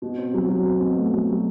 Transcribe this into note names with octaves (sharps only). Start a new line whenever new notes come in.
B2
C4
F#3
F#3
C4
B2
A3
F#3
F#3